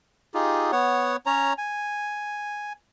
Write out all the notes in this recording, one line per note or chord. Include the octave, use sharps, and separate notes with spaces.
D#4 F4 G4 G#4
B3 C#5 F#5
C#4 C#5 A#5
G#5